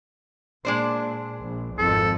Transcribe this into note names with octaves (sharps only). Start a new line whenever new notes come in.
A#2 G#3 D4 C5
A#1
G#1 F2 F3 A4